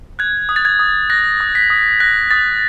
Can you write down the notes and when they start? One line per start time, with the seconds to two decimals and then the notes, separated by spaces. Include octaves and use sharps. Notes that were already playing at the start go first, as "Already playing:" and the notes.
0.19 F#6 G#6
0.49 D#6
0.56 A6
0.65 G#6
0.79 D#6
1.10 F#6 A#6
1.41 D#6
1.55 B6
1.70 D#6
2.00 F#6 A#6
2.31 D#6 A6